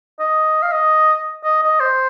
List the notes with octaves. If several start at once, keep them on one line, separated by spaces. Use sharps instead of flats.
D#5
F5
D#5
D#5
D#5
C5